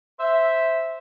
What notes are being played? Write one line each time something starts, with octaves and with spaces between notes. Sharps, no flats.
C5 E5